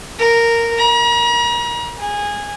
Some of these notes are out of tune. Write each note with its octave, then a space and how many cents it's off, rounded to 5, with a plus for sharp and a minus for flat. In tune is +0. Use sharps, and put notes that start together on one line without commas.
A#4 -10
A#5 +40
G#4 -15